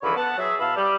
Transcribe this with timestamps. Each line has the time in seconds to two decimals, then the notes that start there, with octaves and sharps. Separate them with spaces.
0.02 C#2 D3 E3 F3 C#5 B5
0.16 B3 F#5 A5
0.38 F#3 G#4 E5
0.59 B2 E3 F5 A5 B5 E6
0.76 G3